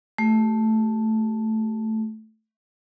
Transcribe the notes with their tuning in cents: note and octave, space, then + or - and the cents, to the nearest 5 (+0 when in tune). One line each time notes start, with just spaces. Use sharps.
A3 +0 G4 -15